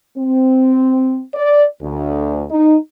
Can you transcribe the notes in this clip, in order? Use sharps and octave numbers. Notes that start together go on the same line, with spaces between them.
C4
D5
D2
D#4